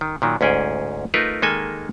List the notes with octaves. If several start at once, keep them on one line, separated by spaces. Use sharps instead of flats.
D#3
A#2 D#3 F#3
D2 G#2 C#4 G#4 G5
A3 D#4 F4 A#4 B4
D#3 G#3 A#3 A4 D#5 G#5